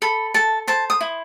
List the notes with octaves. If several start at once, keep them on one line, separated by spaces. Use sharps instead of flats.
A4 B5
A4 A5
C5 A5
D#6
E4